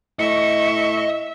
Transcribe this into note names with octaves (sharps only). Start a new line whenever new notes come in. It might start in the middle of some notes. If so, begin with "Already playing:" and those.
A2 D#5 E5 C#6